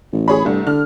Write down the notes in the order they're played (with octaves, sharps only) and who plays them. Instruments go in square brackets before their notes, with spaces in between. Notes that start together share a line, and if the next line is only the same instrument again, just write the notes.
[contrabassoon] A1
[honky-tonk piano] G#4 C#5 B5
[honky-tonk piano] C2 A3 [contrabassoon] G2
[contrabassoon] D3 [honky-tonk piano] F6